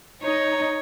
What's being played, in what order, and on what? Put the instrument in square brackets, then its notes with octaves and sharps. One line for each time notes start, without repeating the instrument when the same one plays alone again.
[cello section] D#4 [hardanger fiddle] C#5